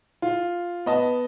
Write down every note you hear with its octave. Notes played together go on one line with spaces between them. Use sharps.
F4
B3 D#5 A5